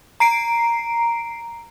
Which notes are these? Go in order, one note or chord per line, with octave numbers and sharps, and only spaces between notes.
A#5 C7 D7